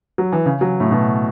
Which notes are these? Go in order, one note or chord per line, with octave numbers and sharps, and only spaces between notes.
F#3
E3
C#3
F#3
A2
B2